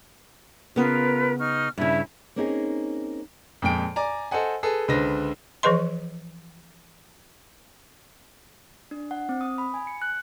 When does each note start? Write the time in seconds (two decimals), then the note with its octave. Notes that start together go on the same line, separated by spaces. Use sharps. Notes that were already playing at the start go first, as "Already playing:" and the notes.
0.76 C#3 B3 F4 A#4 B4
1.38 D#4 C#6 F6
1.78 G2 C#3 E4 E5
2.36 A#3 C4 C#4 D#4 G#4
3.62 F2 A#2 G#3 G5 D7
3.96 D5 G#5 A#5
4.31 A4 C5 D#5 F#5 G#5
4.63 G#4 A4 B4
4.88 C#2 D3 B4 C5 A#6
5.63 E3 F3 G#4 B4 D#5 C6
8.91 D4
9.11 F#5
9.29 C4
9.41 D#6
9.58 B5
9.74 G#5
9.87 C#7
10.02 F#6